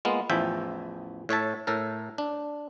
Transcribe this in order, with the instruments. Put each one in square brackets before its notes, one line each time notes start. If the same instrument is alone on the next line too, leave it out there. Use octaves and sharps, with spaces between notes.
[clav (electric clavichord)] G#3 A#3 B3 F4
A1 E2 F3 E5 G5 G#5
A2 C#5 E5 A5
A2 A4 A#4
D4